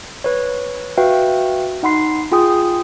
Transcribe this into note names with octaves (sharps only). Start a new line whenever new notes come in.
B4 C#5
F#4 B4 E5 F5 G5
D#4 F#5 B5 C6 C7
F4 G#4 G5 G#5 D#6